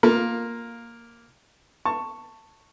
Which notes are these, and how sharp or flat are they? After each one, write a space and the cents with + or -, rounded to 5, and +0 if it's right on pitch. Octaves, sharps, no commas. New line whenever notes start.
A#3 +0 F4 +10 A#4 +0
A5 +15 C#6 +0